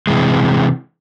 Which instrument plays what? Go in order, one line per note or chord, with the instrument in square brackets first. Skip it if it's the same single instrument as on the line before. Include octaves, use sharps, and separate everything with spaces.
[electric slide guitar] C3 E3 G#3